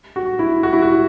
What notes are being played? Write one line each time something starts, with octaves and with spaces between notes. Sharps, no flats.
F#4
E4
F#4
E4
F#4